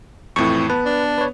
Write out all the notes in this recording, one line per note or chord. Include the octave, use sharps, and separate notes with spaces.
F2 A2 E3 C4 C#6
B3 B4 A5
D4
B4 C#5